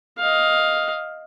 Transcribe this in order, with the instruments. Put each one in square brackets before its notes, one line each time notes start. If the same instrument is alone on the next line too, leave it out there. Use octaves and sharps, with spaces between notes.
[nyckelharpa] D#5 F5